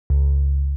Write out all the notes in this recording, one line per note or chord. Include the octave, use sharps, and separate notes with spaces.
C#2